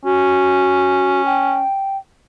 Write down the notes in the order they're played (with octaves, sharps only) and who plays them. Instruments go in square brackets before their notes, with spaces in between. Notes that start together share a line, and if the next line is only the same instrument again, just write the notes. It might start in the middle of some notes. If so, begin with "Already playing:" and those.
[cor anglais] C#4 [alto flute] F#4
[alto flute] G5